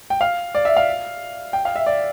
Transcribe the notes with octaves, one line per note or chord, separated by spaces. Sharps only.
G5
F5
D5
E5
F5
G5
F5
E5
D5